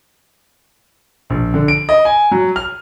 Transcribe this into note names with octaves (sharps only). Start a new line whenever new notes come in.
A#1
D3
D7
D#5
G#5
F#3
F6